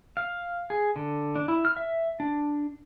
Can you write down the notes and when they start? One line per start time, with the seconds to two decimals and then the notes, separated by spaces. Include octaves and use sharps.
0.17 F5
0.70 G#4
0.96 D3
1.36 D4
1.48 E4
1.65 F6
1.77 E5
2.20 D4